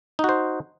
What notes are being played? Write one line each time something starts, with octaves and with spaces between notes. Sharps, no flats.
D#4 F#4 C5